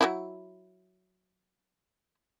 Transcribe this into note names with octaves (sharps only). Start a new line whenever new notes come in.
F#3 D#4 E4